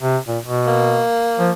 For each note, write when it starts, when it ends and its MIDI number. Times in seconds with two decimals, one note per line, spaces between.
0.01 0.18 48
0.28 0.38 46
0.44 1.02 47
0.67 1.52 58
1.39 1.52 53